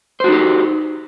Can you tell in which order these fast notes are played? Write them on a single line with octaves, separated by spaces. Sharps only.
C5 F#4 D#4 G4